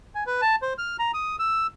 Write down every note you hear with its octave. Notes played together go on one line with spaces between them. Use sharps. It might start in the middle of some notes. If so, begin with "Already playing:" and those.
G#5
B4
A5
C5
F6
A#5
D#6
E6